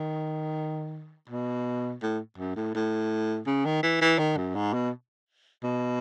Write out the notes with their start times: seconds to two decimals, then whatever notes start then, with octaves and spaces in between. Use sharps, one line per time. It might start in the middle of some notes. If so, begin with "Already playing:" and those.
Already playing: D#3
1.29 B2
2.02 A2
2.38 F#2
2.56 A2
2.75 A2
3.47 C#3
3.65 D#3
3.83 E3
4.01 E3
4.18 D#3
4.37 F#2
4.55 G#2
4.74 B2
5.63 B2